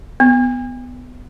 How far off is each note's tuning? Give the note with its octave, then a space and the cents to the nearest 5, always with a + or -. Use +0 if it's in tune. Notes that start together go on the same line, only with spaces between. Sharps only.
B3 +15